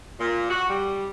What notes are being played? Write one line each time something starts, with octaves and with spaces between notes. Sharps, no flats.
A#2
F#4
G3